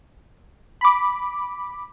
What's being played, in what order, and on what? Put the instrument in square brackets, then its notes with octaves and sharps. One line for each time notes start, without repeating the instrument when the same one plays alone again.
[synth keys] B5 D6